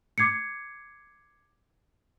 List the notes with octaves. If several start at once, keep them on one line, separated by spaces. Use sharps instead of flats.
D6 G#6 C7 C#7